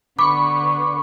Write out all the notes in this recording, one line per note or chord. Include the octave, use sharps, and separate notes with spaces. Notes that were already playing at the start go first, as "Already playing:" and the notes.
D3 B3 B5 C#6 D6